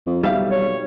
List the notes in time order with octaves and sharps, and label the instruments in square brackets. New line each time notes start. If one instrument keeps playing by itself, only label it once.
[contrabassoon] F2
[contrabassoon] B1 [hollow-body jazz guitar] G3 E5 F5
[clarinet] C#5